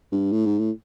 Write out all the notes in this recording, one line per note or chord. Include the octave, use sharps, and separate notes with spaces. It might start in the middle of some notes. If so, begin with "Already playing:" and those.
G2
A2
G#2
A2